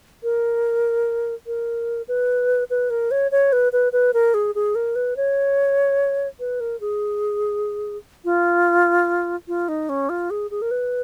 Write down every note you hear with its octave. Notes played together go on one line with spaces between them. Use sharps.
A#4
A#4
B4
B4
A#4
C#5
C#5
B4
B4
B4
A#4
G#4
G#4
A#4
B4
C#5
B4
A#4
G#4
F4
F4
D#4
C#4
F4
G#4
G#4
A#4
B4